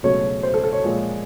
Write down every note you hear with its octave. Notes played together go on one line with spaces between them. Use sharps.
C#2 B2 F#3 A3 C#5
C5
A4
A4
C#5
A#2 F3 G#3